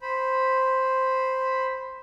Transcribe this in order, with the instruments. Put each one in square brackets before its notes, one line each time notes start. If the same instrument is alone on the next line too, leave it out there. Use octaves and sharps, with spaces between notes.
[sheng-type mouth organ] C5 B5